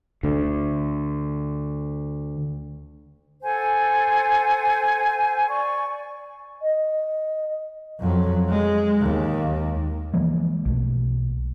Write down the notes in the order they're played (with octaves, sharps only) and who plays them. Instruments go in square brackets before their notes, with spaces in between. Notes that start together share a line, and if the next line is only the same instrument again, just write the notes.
[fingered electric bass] D2 D3
[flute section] A4 C5 F#5 G#5
D5 C#6
[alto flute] D#5
[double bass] F2 F#3
G#3
D#2
[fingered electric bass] E3 F3 G#3 A#3
B1 A3